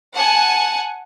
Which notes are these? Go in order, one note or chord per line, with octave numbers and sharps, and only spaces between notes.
F#5 G#5 A5